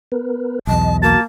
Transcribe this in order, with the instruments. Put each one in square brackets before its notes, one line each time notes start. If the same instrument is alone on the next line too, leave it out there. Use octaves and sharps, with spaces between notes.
[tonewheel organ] B3 A#4 B4
[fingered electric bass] B1 E2 [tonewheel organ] D#5 [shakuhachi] A5
[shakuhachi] A#3 [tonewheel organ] F#4 [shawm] A5